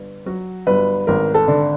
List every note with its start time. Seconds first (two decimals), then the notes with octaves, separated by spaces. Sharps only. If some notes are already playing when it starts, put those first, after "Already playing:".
Already playing: G1
0.26 F#3 F#4
0.67 G1 B4
1.07 G#1 A#4
1.34 A4
1.48 D3